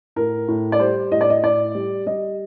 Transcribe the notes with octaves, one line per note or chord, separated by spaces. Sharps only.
A2 A#4
A2
D5
G3 C5
A2 D#5
D5
D#5
A2 D5
G3
G3 D#5